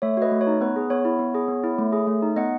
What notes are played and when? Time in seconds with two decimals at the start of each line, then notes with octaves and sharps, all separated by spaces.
0.02 A3 C#5 E5
0.17 F#4 B4 D#5
0.32 A3
0.41 C#5
0.47 D#4
0.61 B3 B4
0.76 G#4
0.90 B3 C#5
1.05 E4
1.19 B3
1.34 G#4
1.48 B3
1.64 E4
1.79 A3
1.92 G#4
2.07 A3
2.22 D#4
2.36 B3 D#5 F#5